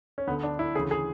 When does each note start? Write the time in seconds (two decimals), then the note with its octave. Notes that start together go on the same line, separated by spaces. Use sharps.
0.18 C#4
0.27 D2 D3 B3
0.43 D4
0.59 E4
0.75 D2 C#3 E3 G#4
0.91 G#4